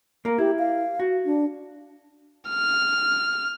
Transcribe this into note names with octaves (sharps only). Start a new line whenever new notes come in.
A#3 A#4
E4 G4
F5
F#4
D4
F6